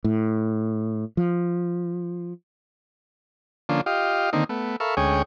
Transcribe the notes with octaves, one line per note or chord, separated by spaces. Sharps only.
A2
F3
D3 F3 A#3 C#4 D4 F4
F4 G4 D#5 F5
D3 D#3 A#3 C4 D#4
A3 B3
A4 A#4 E5 F5 B5 C#6
D2 G#3 C#4 G#4 C#5 G5